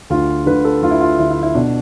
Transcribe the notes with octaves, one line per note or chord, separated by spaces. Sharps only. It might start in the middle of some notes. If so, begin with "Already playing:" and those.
D2 D3 F4
D2 D3 B4
A4
D2 D3 F4
E4
F4
D2 D3 E4
E4
E4
B2 D4